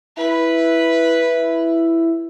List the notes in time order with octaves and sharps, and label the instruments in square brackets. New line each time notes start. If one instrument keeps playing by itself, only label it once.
[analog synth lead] E4 [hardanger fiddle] B4